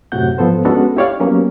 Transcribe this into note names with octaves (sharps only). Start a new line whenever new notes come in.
F#2 A2 C3 F#4 F#5 G6
G#2 F3 B3 A4 C5
G#3 B3 C#4 D4 F#4 A4
E4 G4 C#5 D5 F5
F#3 A#3 B3 C#4 G4